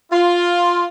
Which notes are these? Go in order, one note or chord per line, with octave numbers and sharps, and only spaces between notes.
F4